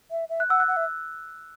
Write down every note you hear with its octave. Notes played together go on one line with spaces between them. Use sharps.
E5
E5
F#6
F#5 E6
F#6
F#5
E5